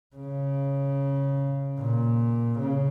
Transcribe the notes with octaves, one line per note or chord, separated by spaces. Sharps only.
C#3
A#2
C#3